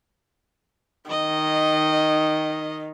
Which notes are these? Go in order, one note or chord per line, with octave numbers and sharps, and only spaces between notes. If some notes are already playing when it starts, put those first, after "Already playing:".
D#3 D#5